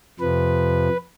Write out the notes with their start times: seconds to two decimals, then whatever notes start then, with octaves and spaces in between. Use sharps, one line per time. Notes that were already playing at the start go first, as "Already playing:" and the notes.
0.20 F2 C3 F3 B4